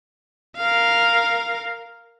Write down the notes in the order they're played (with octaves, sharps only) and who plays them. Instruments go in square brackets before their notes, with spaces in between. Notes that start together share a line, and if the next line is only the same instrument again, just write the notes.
[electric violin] A#4 F5